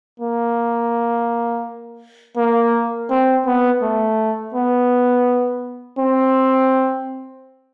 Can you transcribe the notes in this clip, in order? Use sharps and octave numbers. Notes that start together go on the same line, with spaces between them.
A#3
A#3
C4
B3
A3
B3
C4